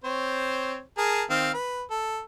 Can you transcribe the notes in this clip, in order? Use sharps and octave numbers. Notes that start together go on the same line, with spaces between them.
C4 C5 C#5
G#4 A#4 A5
D#3 C4 F5
B4
A4